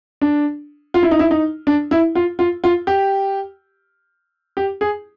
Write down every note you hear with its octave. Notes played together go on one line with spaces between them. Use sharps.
D4
F4
E4
D#4
E4
D#4
D4
E4
F4
F4
F4
G4
G4
G#4